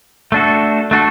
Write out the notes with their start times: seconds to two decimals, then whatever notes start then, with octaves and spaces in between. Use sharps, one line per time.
0.32 A3 D4 F#4 A4
0.91 A3 D4 F#4 A4